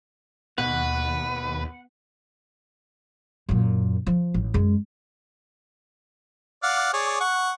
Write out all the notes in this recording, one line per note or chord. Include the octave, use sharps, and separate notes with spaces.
D#2 B2 B4 F#5
F#2 A#2
F3
A1
F#2 G#3
D5 F5 F#5
G#4 C#5 D5
F#5 C#6